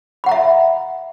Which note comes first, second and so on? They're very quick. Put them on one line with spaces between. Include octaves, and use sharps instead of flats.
B5 F#5 A#5 E5